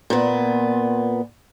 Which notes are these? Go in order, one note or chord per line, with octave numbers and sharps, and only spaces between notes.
A#2 B3